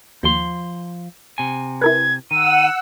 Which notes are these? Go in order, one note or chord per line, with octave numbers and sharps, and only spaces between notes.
D#2 F3 C6
C3 G#5
E4 A#4 B4 G#6
D#3 F#5 E6 D#7